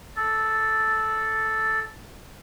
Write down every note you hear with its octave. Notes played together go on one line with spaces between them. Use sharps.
A4 D5